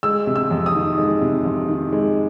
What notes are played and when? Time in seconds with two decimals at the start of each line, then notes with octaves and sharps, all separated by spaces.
0.03 G#3 E6
0.27 C3
0.36 E6
0.51 F2
0.66 D#6
0.75 D#3
0.98 G#3
1.22 C3
1.45 F2
1.68 D#3
1.92 G#3